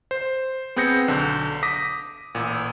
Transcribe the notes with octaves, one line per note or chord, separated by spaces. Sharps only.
C5
B3 C4 G#4 G6 A#6 C#7
B1 D3
D6 D#6 A#6 B6
A1 A#2